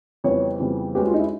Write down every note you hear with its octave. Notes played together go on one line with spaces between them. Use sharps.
F2 C#3 E3 G3 B3 C#5
F2 C#3 E3 G3 B3
G#3 C#4 F#4 G4 B4
F4
D#4
E4